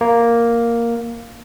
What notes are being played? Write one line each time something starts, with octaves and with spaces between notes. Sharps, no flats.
A#3